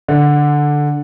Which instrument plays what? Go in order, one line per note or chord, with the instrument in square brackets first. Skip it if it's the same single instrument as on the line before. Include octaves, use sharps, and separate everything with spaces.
[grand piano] D3